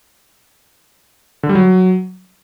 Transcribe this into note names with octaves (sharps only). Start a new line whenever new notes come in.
D3
G3
F#3